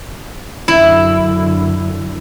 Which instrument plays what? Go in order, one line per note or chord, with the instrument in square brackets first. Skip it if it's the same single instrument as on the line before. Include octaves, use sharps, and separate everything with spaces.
[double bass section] F#2 D3 [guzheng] E4